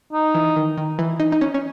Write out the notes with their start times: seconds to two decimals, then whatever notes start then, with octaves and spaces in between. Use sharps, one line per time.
0.13 D#4
0.34 E3
0.56 D#3
0.78 D#3
0.99 E3
1.20 D#4
1.32 D#4
1.41 C#4
1.54 C#4